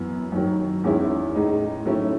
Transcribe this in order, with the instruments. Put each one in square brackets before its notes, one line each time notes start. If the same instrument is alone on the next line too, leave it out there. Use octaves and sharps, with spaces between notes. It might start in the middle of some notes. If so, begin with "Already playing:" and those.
Already playing: [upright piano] F#2 E3 B3
F#2 D#3 F#3
E2 D#3 G#3 C#4 E4
A2 G#3 D#4
D#3 F#3 A3 C#4 E4